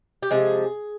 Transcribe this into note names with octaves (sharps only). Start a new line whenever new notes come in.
G4
C3 F3 G#3 G#4